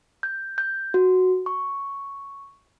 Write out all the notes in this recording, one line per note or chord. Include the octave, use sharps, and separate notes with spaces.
G6
G6
F#4
C#6